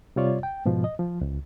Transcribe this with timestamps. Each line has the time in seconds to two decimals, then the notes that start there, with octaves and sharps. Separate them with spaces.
0.16 C3 G3 F4 C#5 D5
0.43 G5
0.66 G#2 B2 F3
0.84 D#5
0.99 F3
1.21 C#2